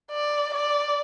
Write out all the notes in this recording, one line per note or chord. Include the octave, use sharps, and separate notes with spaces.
D5
D5